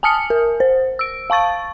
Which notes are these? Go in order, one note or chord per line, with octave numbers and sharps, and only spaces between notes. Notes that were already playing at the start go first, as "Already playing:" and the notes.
G#5 A5 D#6 F6 C#7
A#4
C5
E6 D7
F5 A5 C#6 A6